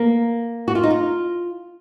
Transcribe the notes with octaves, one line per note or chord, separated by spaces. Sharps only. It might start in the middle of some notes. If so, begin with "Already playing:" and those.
Already playing: A#3
F#4
F4
D#4
F4